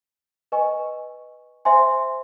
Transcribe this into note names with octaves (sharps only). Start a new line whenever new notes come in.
B4 D#5 G#5 C#6
C5 E5 G#5 C6